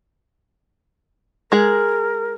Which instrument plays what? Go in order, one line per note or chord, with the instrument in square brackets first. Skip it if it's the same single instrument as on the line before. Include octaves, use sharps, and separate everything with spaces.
[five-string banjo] G#3 G#4 [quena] A#4